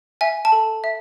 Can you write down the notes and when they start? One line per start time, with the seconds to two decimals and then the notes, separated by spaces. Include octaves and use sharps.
0.21 E5 G#5
0.45 A5
0.52 A4
0.84 E5